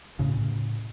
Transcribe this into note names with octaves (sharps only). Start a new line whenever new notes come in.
A2 C#3